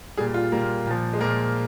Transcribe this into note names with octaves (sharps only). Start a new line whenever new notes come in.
A#2 G3 G#4
F4
A#2 G3 A#3
A#2 F3
G#3
A#2 F3 A#3